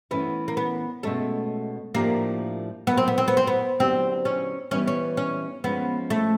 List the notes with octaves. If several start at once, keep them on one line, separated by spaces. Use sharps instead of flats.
E3 A3 B3 C#4 E4
A#3
B3
B2 G#3 A3 C#4
A2 F3 A3 A#3 D4 G4
A2 F#3 A#3 B3
C4
B3
C4
B3
C4
B3
D3 F#3 B3 C4 E4 G4
C#4
E3 G3 B3 C#4 D#4
C#4
C#4
F3 G#3 B3 C#4
A3